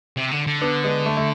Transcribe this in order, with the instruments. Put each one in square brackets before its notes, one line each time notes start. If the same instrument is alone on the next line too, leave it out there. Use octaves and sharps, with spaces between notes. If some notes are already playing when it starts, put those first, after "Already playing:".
[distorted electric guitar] C3
D3
D3
[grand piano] B3 D4
G#3 B3
A3
A3